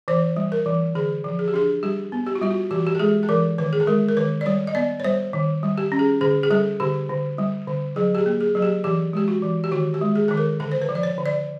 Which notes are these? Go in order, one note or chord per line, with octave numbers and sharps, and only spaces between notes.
E3 C5
G3
A#4
E3
D3 G#4
F3
G#4
G4
D4 G#4
G3 G4
B3
G4
F#4
G3 F4
F#4
E3 G4
F#4
G4
A4
G#3 G#4
A4
E3 A#4
D#3 B4
G#4
A4
G#3 A#4
A#4
D#3 B4
D5
G3 C#5
D#5
B3 D5
C#5
G3 C5
D#3
G3
G4
C#4
G#4
D3 G#4
G#4
G3 A4
D3 G4
D3
G3
D3
F#3 G#4
G4
G#4
A#3
G#4
F#3 G#4
G4
E3 G4
G#3 G4
F#4
E3
G4
D#3 F#4
G4
G#3
G#4
D#3 A4
A#4
D3 A4
C5
B4
F3
D5
C#5
D3
D5